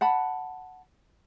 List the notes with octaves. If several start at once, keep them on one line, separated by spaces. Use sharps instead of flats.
F#5 A5 B5